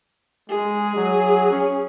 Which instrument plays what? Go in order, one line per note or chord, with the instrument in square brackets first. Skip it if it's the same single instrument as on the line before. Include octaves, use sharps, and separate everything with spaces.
[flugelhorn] G#3 [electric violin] G#4
[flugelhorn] F#3
C#4